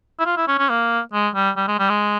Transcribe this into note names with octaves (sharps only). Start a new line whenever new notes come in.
E4
F4
E4
C#4
C#4
A#3
G#3
G3
G3
G#3
G3
G#3